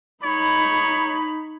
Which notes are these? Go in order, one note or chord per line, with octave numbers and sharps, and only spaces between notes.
D#4 C#5 B5